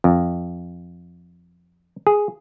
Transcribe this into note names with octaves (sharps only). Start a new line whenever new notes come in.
F2
G#4